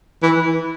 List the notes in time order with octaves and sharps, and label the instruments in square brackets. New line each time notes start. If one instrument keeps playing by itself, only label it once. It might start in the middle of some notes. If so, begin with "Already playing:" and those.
[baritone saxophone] E3